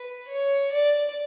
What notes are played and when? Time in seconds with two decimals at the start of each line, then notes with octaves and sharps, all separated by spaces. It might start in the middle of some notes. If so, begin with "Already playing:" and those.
Already playing: B4
0.28 C#5
0.72 D5